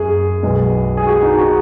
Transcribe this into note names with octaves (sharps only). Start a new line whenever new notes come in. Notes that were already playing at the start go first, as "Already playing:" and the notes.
Already playing: F#2 G#4
B1 B2 G#3
G#4
F#4
D#4
F#4